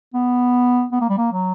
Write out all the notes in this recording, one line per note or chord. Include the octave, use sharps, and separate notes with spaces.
B3
B3
A#3
G3
A#3
F#3